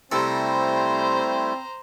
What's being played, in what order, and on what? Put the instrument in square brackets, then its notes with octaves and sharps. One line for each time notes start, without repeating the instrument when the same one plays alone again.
[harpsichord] C3 A4 [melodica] G3 A3 E4 [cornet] C4 [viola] C5 A#5